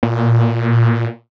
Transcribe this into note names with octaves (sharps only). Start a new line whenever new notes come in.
A#2